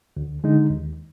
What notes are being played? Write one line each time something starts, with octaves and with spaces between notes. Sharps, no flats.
D2
D3 G#3 D#4
D#2